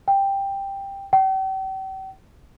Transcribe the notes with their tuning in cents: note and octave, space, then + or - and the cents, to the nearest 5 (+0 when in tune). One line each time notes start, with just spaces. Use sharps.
G5 +10
G5 -40